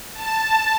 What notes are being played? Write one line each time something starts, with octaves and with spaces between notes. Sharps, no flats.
A5